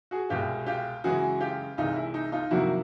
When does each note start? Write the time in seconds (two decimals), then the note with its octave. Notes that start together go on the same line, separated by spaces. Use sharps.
0.11 F#4 G#4
0.30 C2 B2 G#3 F4 G4
0.66 F4 G4
1.04 F#2 C#3 E3 G#3 F#4 G#4
1.40 F4 G4
1.77 C2 C3 E3 G#3 D#4 F4
1.96 E4
2.14 D#4
2.32 D#4 F4
2.51 F2 C3 D#3 F#3 A#3 E4 F#4